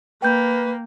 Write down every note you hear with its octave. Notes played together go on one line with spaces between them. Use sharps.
A#3 B4 G5 G6